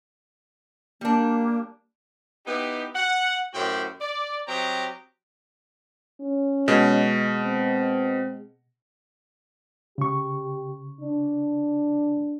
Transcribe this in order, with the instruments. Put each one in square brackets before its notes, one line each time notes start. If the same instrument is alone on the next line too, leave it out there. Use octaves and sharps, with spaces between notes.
[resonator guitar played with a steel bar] G3 D4 [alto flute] A#3
[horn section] B3 D#4 E4 G4
F#5
F#2 A2 F#4 G4 C5 G5
D5
F#3 C4 G4 D#5 G5 A#5
[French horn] C#4
[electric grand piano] B2 [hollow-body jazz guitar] G#3
[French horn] C4
[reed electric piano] C#3 C#6 [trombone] G4
[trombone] D4